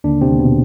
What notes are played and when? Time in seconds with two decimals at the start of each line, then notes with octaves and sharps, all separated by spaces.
0.04 D#2 D3 D4
0.21 C3 C4
0.30 D#2
0.39 B2 B3